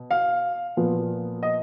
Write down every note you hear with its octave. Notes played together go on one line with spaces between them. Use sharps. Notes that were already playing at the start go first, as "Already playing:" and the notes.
Already playing: B2
F5
A#2 F3 B3
D#5